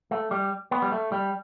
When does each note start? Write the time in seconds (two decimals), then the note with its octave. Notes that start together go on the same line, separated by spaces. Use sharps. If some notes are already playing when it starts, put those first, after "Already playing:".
0.11 A3
0.31 G3
0.71 B3
0.82 G3
0.92 A3
1.12 G3